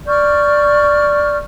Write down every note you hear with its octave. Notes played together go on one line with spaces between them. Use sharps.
D5 C#6 F6 G6